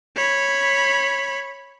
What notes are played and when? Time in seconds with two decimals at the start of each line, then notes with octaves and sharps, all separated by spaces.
0.16 C#5 B5